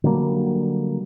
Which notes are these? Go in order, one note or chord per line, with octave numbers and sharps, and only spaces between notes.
D3 F#3 G3 A#3